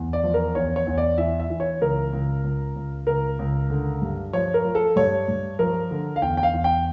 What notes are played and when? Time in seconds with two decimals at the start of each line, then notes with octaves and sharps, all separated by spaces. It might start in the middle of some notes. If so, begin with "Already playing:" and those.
Already playing: E2
0.13 D5
0.23 F3
0.34 A#4
0.55 E2 C#5
0.76 C#5
0.87 E2
0.98 D5
1.18 E3 E5
1.40 E5
1.50 E3
1.60 C#5
1.81 C#2 A#4
2.13 C#2
2.44 C#2
2.75 C#2
3.07 C#2 A#4
3.39 C#2
3.70 D3
4.02 G2
4.33 F3 C#5
4.54 A#4
4.65 F3
4.75 A4
4.96 G2 C#5
5.28 G2
5.59 F3 A#4
5.91 D3
6.16 F5
6.22 E2 G5
6.37 G5
6.43 F5
6.54 E2
6.64 G5